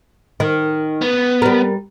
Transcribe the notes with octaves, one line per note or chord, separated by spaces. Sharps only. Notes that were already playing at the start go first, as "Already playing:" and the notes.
D#3
B3
G3 A#4